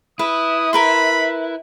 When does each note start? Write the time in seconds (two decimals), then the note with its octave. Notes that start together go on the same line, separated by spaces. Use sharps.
0.19 E4 B4 D#6
0.73 A#4 B4 B5 C6